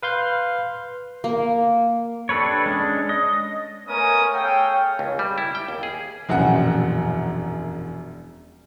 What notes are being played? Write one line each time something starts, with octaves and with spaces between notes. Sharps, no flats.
B4 F5 C6 G6
A#3
D4 G4 A4 B4 C#5
G#3 C#4 D4
D#5
A3 B3 C#4 A#4 G#5 D#6
G#4 A4 C#5 F5 G5
C#2
G3
E4
G5
D#2
G#4
E1 A#1 F#2 F#5